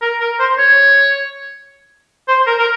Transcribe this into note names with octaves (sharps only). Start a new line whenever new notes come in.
A#4
A#4
C5
C#5
C5
A#4
A#4